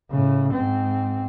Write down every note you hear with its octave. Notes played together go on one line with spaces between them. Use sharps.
A2 C#3
G#2 C4